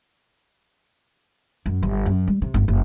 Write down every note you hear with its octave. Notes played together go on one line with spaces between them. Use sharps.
F#2
G1
F#2
G3
C3
G1
F#1